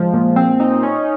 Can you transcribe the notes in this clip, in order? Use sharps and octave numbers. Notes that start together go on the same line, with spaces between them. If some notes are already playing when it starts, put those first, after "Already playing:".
Already playing: F3 G#3
A#2
C4
D#4
C#4